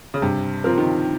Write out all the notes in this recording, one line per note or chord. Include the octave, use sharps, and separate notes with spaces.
C#3
G2 C3
F3 C4 F4 A#4
D#3